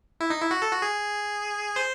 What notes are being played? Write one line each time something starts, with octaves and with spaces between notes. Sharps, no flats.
E4
D#4
E4
F#4
A4
F#4
G#4
C5